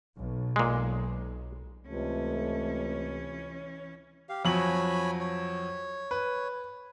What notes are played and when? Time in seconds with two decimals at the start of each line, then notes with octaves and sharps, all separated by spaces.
0.16 B1
0.56 A#2 G#3
1.88 C#2 C3 E3 A3 C#4
4.29 G4 F5
4.45 F2 F#3 C#5 G#5 B5 F#7
5.20 C#5
6.11 B4